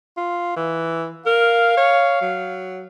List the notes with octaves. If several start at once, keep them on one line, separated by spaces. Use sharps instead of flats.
F4
E3
A#4 F5
C#5
F#3